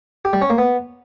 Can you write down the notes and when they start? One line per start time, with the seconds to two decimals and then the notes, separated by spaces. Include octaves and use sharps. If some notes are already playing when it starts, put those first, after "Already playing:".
0.25 G4
0.33 G3
0.42 C#4
0.50 A#3
0.58 B3